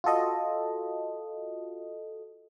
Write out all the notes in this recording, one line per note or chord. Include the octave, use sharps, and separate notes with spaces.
F4 F#4 A4 D#5